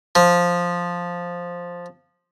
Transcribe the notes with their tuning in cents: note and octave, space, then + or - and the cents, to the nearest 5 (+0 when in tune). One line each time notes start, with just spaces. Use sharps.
F3 +5